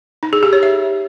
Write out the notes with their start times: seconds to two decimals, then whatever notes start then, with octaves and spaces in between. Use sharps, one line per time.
0.23 D#4
0.33 G#4
0.43 G4
0.53 C#5
0.63 E5